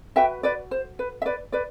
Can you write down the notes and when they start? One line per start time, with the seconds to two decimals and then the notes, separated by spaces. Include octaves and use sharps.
0.16 F#4 B4 E5 G5
0.43 B4 D5
0.71 C5
0.99 B4
1.22 E5
1.26 B4 D5
1.52 B4 D5